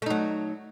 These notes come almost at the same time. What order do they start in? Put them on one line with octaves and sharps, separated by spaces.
A3 D#4 F#3